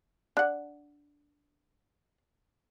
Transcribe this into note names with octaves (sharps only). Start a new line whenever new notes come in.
D4 F#5